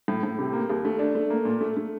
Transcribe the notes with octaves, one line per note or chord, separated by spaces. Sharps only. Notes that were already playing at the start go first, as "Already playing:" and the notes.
A2
A2
C3
A#3
D#2
A3
D4
A3
A#3
A#2
A3
A3